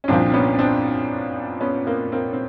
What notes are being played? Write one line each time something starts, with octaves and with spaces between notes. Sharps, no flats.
C#4
C2 A#2 F3 C4 D4
C4
B3 C#4
C4 D4
B3 C#4
A#3 C4
A#3 C4
C4